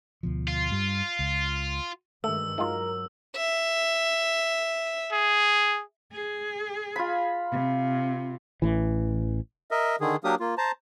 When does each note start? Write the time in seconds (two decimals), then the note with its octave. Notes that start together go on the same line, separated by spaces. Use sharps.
0.23 D2 B2 F3
0.48 F4
0.71 G2 G3
1.19 C#2
2.24 G2 D#3 G#3 A3 E6
2.58 D#3 F#3 G#3 F4 A#4
3.36 E5
5.12 G#4
6.12 G#4
6.96 F4 B5
7.51 C3
8.62 A1 E3
9.71 A#4 D#5 E5
10.00 D3 D#3 G#4
10.24 F#3 A#3 D4 G4 A#4 D#6
10.40 A#3 F4
10.58 C5 A5 A#5